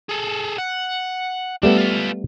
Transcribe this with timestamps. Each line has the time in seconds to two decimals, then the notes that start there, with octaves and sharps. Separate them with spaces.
0.09 G#4 A4
0.58 F#5
1.63 G3 A3 B3 D4 E5
1.78 F4 B4